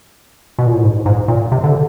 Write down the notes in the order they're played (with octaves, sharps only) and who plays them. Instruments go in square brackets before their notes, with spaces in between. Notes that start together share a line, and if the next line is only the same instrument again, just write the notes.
[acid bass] B2
A#2
A2
G#2
G#2
A#2
C3
D3